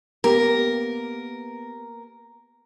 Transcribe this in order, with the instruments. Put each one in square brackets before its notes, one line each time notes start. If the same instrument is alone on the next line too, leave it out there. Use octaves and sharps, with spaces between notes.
[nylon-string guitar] A#3 B3 G4 [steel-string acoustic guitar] A#4